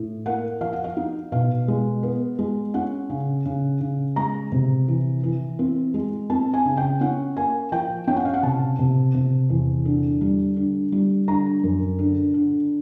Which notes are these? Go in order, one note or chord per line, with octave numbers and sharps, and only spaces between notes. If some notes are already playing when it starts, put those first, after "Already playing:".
Already playing: A2
A#3 F#5
F3 F5
F#5
F5
D#4
B2 F5
G#3
B3
G#3
C#4 F#5
C#3
C#3
C#3
G#3 A#5
C3
E3
E3
C4
G#3
C4 A5
G#5
C#3
G5
C#4 F#5
A#3 G#5
F3 G5
C#4 G5
F#5
F5
F#5
C3 A5
C3
C3
E2
D3
G3
D3
G3
D3 A#5
F#2
D3
D3